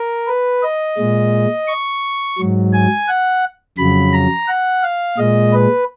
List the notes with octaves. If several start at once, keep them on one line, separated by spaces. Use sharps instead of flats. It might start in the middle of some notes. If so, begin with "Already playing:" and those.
Already playing: A#4
B4
D#5
A#2 G#3
C#6
G#2 F#3
G#5
F#5
F2 C#3 F#3 B5
A#5
F#5
F5
A#2 G#3 D#5
B4